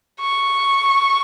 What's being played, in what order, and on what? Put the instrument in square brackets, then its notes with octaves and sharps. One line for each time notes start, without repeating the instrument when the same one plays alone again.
[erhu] C#6